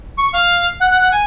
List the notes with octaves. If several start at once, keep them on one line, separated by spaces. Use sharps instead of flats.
C#6
F5
F#5
F#5
F#5
G#5